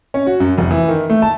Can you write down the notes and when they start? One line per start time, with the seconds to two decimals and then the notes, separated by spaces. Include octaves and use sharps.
0.14 C#4
0.27 F#4
0.40 F#2
0.58 F1
0.71 E3
0.88 D#3
1.10 A3
1.22 A5